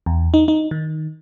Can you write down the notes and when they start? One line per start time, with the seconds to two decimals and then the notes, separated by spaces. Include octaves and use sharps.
0.06 E2
0.34 D#4
0.48 D#4
0.71 D#3